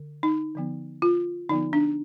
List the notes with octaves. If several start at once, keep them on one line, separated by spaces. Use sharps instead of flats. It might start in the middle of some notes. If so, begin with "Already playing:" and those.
Already playing: D3
D#4
D3 F3 B3
F4
D3 F3 B3 D#4
D4